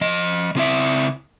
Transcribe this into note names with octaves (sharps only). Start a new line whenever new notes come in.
F3 D#5
C#3 C4 E4 E5